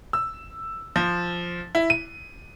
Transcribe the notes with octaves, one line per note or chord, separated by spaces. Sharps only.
E6
F3
E4
D#7